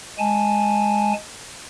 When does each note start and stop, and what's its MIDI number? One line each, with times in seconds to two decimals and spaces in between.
0.19 1.13 56
0.19 1.13 80
0.19 1.13 81